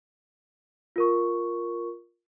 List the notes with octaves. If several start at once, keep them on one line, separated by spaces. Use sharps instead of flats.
F4 A#4 C#6